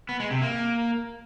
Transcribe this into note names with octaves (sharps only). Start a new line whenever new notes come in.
B3
G#3
C3
A#3